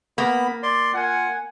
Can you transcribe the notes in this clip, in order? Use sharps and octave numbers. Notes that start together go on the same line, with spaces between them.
A#3 B3 B5
D5 C6
F4 A#4 F#5 G#5